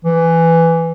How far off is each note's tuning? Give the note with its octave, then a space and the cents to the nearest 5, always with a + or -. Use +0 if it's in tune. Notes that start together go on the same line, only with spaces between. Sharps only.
E3 +10